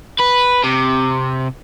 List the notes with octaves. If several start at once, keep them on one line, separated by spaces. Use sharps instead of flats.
B4
C3